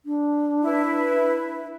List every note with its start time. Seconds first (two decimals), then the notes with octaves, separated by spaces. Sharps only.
0.06 D4
0.63 E4 B4